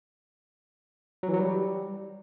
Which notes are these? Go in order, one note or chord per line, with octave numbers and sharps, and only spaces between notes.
F#3
E3
F#3
G3